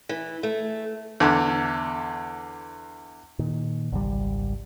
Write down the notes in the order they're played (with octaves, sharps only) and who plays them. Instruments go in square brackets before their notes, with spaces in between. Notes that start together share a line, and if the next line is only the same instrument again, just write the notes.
[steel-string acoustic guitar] E3
A3
[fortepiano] E2 D3
[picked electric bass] A#2 D#3
G#1 C#2 G3